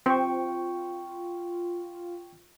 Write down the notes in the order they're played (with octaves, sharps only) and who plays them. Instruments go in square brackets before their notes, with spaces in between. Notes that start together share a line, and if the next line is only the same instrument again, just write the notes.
[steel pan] C4 C5 [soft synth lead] F4 [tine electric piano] G5 C#6